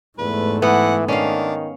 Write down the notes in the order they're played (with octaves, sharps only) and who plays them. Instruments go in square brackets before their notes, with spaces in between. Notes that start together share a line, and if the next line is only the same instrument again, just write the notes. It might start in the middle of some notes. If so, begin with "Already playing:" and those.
[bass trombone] E2 [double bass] G#2 A3 [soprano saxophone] B4
[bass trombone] E3 [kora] B3 [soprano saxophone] F#5
[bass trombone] D#3 [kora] C#4 F5 [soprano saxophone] D4